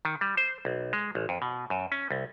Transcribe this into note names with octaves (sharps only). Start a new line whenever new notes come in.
D#3
G3
C5
B1
G#3
A1
F2
B2
F#2
C#4
C2